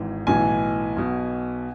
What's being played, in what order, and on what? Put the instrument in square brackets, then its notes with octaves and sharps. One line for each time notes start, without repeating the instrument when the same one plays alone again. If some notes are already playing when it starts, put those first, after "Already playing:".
Already playing: [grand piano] G#1 G#2 E3
B1 A2 E3 G#5
B1 B2